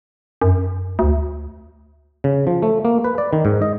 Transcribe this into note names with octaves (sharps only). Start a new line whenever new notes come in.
F#2
D2
C#3
F3
A3
A#3
B4
D5
D#3
G#2
D#5